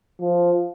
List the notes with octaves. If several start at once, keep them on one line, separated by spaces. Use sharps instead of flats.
F3